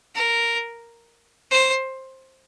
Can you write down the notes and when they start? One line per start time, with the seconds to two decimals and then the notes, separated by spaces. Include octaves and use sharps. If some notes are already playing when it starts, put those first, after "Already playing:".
0.15 A#4
1.51 C5